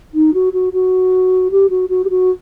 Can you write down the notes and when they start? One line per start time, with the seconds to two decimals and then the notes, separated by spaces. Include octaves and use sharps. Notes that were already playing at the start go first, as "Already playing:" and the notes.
0.14 D#4
0.34 F#4
0.53 F#4
0.73 F#4
1.51 G4
1.70 F#4
1.89 F#4
2.05 G4
2.10 F#4